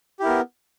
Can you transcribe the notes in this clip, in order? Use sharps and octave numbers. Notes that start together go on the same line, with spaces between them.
B3 E4 G4 A#4